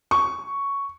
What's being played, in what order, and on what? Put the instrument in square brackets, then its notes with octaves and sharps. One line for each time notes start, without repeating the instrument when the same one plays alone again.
[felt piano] C#6